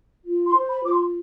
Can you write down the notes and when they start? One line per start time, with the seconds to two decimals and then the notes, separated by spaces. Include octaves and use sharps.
0.25 F4
0.47 C6
0.55 C5
0.69 B5
0.84 F4 D6
0.91 C6